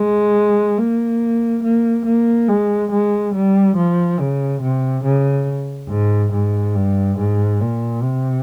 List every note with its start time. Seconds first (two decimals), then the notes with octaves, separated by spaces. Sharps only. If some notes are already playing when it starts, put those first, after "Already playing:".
Already playing: G#3
0.78 A#3
1.63 A#3
2.06 A#3
2.48 G#3
2.92 G#3
3.34 G3
3.77 F3
4.20 C#3
4.62 C3
5.04 C#3
5.89 G#2
6.33 G#2
6.75 G2
7.18 G#2
7.60 A#2
8.03 C3